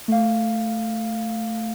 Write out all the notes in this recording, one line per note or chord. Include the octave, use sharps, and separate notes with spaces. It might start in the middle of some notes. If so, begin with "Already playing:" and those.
A3 F5